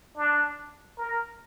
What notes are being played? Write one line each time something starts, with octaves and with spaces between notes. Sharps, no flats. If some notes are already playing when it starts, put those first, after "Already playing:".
D4
A#4